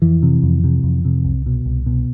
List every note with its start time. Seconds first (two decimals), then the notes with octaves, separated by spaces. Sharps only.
0.02 F2 E3
0.23 C3
0.43 F2
0.64 C3
0.83 F2
1.05 C3
1.24 C2
1.46 B2
1.66 C2
1.86 B2